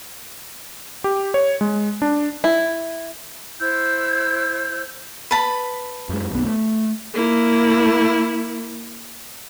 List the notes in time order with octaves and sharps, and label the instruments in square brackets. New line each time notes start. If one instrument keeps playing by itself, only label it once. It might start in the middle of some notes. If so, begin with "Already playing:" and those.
[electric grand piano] G4
C#5
G#3
D4
[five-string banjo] E4
[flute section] E4 C5 E6 G6
[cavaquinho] B4 A5 B5
[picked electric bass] F#2 G#3
F#1 B1 B3
A3
[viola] A#3 E4